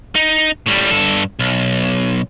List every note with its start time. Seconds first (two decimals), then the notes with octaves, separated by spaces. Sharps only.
0.15 D#4
0.66 A2 G3
0.91 G2 A4
1.39 B1